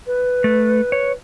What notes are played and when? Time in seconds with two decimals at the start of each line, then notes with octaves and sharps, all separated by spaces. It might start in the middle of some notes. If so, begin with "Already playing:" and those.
0.06 B4
0.44 A3
0.92 C#5